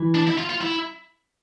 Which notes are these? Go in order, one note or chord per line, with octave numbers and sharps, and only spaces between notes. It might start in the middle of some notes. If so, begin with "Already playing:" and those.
Already playing: E3
D4
E4
F4
F4
E4